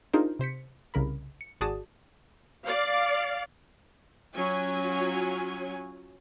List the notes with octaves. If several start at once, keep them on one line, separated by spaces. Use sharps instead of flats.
D4 D#4 F4 G#4 A#4 C5
C3 C5 B6 C#7
C2 C#3 A#4 B5
C#7
G#1 F#4 G#4 D5 A5 D#6
D5 F5
F#3 C#4 F4 G#5